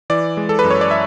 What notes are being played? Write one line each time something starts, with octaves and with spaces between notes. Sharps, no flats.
E3 D5
G#3
A4
B4
F#2
C#5
D5
E5